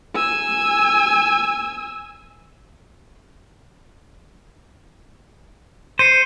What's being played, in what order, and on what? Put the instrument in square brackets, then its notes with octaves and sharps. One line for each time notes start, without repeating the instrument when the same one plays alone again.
[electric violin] G#5 E6
[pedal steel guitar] C5 [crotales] C7 C#7 D#7